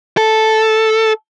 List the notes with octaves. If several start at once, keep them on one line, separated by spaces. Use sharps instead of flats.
A4